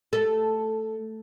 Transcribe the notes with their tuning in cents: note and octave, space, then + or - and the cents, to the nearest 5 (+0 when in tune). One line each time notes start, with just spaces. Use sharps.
A3 +0 A4 +0